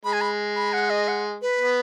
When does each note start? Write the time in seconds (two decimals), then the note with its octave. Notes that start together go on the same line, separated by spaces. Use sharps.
0.04 G#3 B5
0.13 G#5
0.21 B5
0.56 B5
0.73 F#5
0.90 D#5
1.08 F#5
1.42 B4
1.59 B3